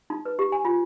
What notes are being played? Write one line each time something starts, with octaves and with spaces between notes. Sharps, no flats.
D#4
B4
G4
G#5
F4